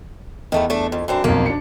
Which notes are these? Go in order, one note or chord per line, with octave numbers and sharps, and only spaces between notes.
E2 D#3 A3 B3
A3 D4
F2
F#2 C4 D4
B1 F2 A#3
D4 C#7